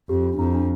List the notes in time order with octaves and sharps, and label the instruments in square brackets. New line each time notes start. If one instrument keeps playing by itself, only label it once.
[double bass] F2 [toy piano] G4
[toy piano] F4
D4
[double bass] F2 [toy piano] E4
[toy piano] D4